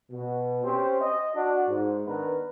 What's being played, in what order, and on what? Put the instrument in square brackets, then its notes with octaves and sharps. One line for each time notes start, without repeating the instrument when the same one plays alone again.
[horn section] B2
C4 C#4 G4 C5
D#5
D4 F#4
G#2
D#3 B3 D4 A#4 B4